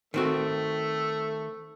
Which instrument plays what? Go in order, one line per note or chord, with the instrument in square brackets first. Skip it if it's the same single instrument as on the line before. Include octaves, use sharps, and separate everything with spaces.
[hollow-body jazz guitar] D#3 C4 F#4 [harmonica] A3